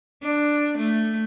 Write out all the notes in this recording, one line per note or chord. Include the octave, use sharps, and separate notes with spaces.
D4
A3